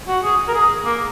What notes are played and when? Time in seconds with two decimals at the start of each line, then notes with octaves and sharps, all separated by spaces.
0.08 F#4
0.23 G#4
0.48 A#4
0.54 G#4
0.85 A#3